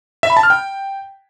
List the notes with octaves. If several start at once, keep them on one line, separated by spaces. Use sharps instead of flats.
E5
B5
A5
F6
G5